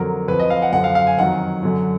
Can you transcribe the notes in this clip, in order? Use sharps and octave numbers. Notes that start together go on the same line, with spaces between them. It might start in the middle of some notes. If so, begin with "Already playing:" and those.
Already playing: F2 D3 F#3 A#4
F2 F3 B4
D#5
F5
F#5
F#2 D3 F3 F#5
F5
F5
G#5
F2 D#3 F#3 F#5
F#2 D3 F#3